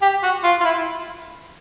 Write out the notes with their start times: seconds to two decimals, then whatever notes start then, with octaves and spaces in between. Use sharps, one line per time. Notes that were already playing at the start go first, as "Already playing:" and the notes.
0.02 G4
0.23 F#4
0.44 F4
0.61 F4
0.64 E4